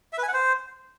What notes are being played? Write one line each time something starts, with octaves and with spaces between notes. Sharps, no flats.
E5
B4
G#5
F#5
C5